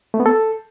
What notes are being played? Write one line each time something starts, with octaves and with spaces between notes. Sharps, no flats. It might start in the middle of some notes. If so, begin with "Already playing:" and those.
A3
B3
A4